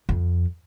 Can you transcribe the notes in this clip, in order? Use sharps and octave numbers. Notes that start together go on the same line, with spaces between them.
F2